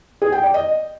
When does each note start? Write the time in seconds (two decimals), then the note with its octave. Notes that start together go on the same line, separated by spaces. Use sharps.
0.22 G#4
0.32 G5
0.43 D5
0.54 D#5